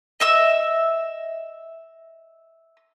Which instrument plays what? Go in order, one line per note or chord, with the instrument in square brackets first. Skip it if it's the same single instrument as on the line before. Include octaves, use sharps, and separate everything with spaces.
[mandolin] D#5 E5 E6